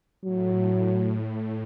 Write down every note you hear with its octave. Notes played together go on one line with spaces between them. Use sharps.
A2 F#3